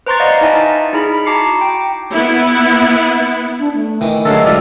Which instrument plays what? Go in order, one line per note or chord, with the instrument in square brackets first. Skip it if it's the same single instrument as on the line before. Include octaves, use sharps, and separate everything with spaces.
[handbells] B4 C5 A#5 C6 C#6 A6
D5 D#5 F5 F#5
D#4 E4 D#5 E5 G#5 A5
D#4 E4 G#4 B5
F#4 A5 A#5 D6 C7 C#7
G5
[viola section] B3 E4
[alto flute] D4
A3
[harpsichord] D#3 E3
[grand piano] D3 F#3 G#3 [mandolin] A4 F5
[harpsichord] B1 [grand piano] F4 D5 [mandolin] G4 A#4 A5 [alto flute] D#5